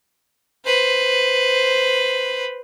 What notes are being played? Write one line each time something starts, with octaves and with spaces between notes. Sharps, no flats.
B4 C5